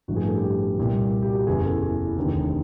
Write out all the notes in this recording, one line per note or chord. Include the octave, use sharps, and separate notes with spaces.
A1 G2 D3 F3 F#4
G#4
A4
G4
G#4
C2 A#2 G3
G4
F#4
G4
F#1 E2 C#3 E3 G#4
A4
G#4
F1 D#2 D3